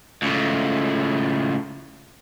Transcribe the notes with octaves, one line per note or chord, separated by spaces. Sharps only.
C#2 A2